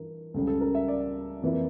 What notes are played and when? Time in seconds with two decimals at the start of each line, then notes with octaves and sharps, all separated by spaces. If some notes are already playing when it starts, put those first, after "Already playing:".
Already playing: G2 E3 A#4
0.34 C#2 C#3 G3 A4
0.47 A4
0.61 A#4
0.75 E5
0.88 D5
1.42 F2 E3 A#3 E4